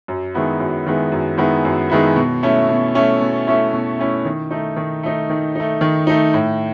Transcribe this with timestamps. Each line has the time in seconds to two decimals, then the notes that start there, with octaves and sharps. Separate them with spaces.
0.08 F#2
0.34 D#3 G#3 B3 E4
0.60 F#2
0.86 D#3 G#3 B3 E4
1.12 F#2
1.38 D#3 G#3 B3 E4
1.65 F#2
1.90 D#3 G#3 B3 E4
2.16 B2
2.43 A3 C#4 E4
2.69 B2
2.95 A3 C#4 E4
3.21 B2
3.47 A3 C#4 E4
3.73 B2
3.99 A3 C#4 E4
4.25 D#3
4.51 A3 D#4
4.76 D#3
5.03 A3 D#4
5.30 D#3
5.55 A3 D#4
5.81 D#3
6.07 A3 D#4
6.34 A2